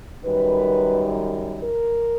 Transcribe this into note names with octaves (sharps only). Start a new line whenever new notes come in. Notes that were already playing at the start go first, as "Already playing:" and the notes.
F#2 D#3 G3 B4
A#4